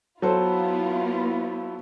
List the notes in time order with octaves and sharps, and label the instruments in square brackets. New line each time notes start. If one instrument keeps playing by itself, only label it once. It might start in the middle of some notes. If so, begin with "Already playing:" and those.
[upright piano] F#3 A4 C5 [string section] B3 E4 F4